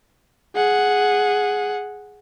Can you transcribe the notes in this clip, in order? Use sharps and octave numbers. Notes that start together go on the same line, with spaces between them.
G#4 F#5